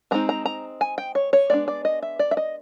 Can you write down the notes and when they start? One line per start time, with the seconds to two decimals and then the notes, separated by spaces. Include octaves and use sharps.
0.11 E3 G#3 C4 D#4 A#5
0.29 A#5
0.46 A#5
0.81 G#5
0.98 G5
1.15 C#5
1.33 C#5
1.50 G#3 B3 D4 D5
1.68 D5
1.85 D#5
2.02 E5
2.19 D5
2.31 E5
2.37 D#5